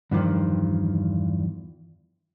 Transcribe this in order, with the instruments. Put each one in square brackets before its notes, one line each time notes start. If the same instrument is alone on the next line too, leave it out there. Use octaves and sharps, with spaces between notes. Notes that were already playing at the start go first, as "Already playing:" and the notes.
[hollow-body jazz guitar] E2 G2 D#3 F3